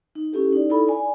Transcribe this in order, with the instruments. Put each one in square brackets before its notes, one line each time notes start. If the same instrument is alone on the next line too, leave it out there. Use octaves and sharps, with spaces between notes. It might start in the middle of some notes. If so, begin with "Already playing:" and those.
[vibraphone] D#4
C#4 E4 G4 A4
D#4 D5
D#4 E4 A4 B5
D5 G#5